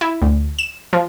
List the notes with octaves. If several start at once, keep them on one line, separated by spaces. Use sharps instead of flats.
E4
D2
E7
F3